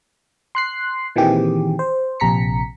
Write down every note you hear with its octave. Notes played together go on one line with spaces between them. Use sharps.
C6 F#6 C7
A#2 D#3 E3 C4 G4 G#4
C5
A#1 C3 A#5 B6 C#7